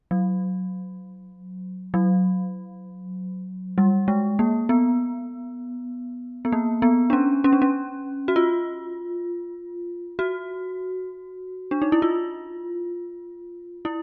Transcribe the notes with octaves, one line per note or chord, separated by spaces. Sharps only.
F#3
F#3
G3
G#3
A#3
B3
B3
A#3
B3
D4
C#4
C#4
D4
C#4
F#4
F4
F#4
D4
D#4
E4
F4
E4